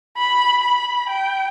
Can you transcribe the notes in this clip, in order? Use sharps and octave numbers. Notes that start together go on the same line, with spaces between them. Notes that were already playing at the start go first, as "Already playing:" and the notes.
B5
B5
G5